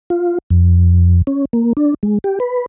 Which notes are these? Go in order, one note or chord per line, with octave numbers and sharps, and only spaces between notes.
F4
F2
C#4
A#3
D4
G#3
G4
B4